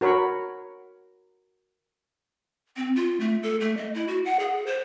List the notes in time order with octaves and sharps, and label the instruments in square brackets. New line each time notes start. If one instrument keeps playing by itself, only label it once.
[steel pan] F#4 A#4 C#5 B5 C#6
[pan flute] C4
F4
A3
A4
A3
D#5
E4
F#4
F#5
G#4
C5